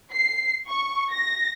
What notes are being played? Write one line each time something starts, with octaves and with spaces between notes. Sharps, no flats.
C7
C#6
A#6